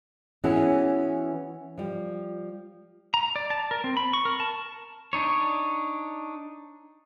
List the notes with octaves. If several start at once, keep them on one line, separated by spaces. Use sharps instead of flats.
E3 B3 C#4 E4 F#4 G#4
F3 G3
A#5
D5
A5
A#4
C4
B5
C#6
A#4
A5
D4 D#4 C#5